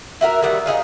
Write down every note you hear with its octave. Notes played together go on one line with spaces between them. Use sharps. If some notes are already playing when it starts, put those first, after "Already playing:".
E4 F#4 A#4 E5
D#3 G3 F#5
D#4 E4 G#4 F5